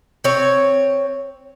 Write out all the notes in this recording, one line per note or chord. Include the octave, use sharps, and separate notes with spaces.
C4 C#5